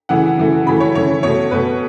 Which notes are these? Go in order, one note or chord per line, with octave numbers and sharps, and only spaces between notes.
C#3 E3 A3 F#5
C#3 E3 A3
C#3 E3 A3 B5
C#5
C#3 E3 A3 C#5
B2 A3 C#5
B2 A3 B4